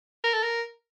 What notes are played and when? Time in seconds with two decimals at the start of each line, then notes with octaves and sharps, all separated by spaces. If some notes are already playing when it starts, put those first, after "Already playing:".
0.24 A#4
0.33 A4
0.43 A#4